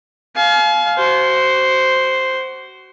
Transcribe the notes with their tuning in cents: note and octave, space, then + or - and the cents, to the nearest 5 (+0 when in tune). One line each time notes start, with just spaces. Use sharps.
F5 +0 G#5 +45
F#4 +25 C5 +0